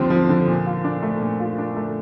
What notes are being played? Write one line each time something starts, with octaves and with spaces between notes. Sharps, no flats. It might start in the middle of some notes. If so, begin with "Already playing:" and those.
Already playing: D#2 D3 F3 C4
F3
D3
A#2
F4
D4
A3
A#2
F4
D4
A3